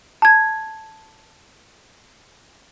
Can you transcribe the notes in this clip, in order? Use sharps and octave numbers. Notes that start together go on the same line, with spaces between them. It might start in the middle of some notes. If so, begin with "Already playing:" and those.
A5 G#6